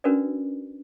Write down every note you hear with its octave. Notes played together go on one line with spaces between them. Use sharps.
C#4 D4 F#4 A#4 B4 D5